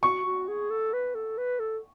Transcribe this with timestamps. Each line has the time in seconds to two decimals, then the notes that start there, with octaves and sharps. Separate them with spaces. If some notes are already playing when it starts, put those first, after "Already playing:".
0.03 F#4 C#6
0.26 F#4
0.48 G#4
0.70 A4
0.93 B4
1.15 A4
1.38 B4
1.59 A4